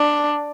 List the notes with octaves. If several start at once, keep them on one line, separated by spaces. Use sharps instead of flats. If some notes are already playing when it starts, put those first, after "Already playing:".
Already playing: D4